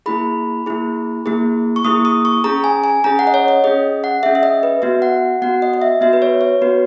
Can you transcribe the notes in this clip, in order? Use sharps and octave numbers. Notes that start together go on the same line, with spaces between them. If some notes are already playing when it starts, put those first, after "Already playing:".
A#3 E4 G#4 B5
A#3 E4 G#4
A#3 E4 G#4
C#6
A#3 E4 G#4 D#6
D#6
C#6
C#4 G#4 A#5
G#5
G#5
C#4 G#4 A#5
F#5
D#5
C#5
D#5
C#4 G#4 D#5
F#5
C#4 G#4 E5
E5
D#5
B4
B3 F#4 E5
F#5
B3 F#4 F#5
D#5
D#5
E5
B3 F#4 E5
B4
C#5
C#5
B3 F#4 B4